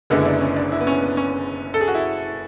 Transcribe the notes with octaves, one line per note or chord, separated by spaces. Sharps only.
F#1 F#2 D3 G#3 B3
E4
D4
C#4
D4
E4
B3
C#4
B3
C#4
A4
G#4
F#4
E4